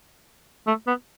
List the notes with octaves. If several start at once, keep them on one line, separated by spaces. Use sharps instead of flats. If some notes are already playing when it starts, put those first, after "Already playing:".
A3
B3